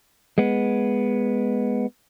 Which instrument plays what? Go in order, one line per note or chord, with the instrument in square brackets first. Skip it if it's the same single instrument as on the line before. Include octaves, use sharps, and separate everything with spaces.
[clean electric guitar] G#3 B3